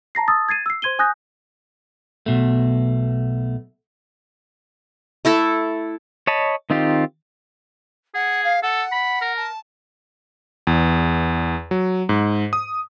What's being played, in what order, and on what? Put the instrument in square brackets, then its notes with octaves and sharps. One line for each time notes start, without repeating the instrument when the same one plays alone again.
[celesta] A5 A#5 A#6 C7
A5 D#6 E6 A6
G#6 A6 C7 D#7
E6 C7
C5 C6 G#6 D#7 G7
G#5 D#6 F#6 G6 A#6
[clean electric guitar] B1 B2 A3
[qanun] A3 E4 A4 E5
[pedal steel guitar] C#5 D#5 A5 B5
D#3 C4 D#4 F4 G4
[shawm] G#4 [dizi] F#5
[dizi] F5
[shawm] A4 [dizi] F#5
[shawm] B5
A#4
[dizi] A5
[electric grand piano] E2
F#3
G#2
D#6